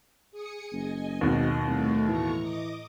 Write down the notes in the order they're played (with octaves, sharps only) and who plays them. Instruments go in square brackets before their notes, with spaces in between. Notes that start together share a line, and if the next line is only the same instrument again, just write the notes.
[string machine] G#4 D#6 C#7
[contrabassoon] F#1 [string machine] D#5 G#5
[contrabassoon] G#1 [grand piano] D#2 B2 D#3 [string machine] D#5
[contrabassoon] C2 [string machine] A3
[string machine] A2 A#5 C#6 [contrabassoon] E3
[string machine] D#5 D6 D#6